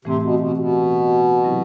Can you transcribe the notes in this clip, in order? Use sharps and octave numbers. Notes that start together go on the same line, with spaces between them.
A2 C3 E3 A3 C4 G4
B2
B2
B2
C3 F#3 C4 E4 G4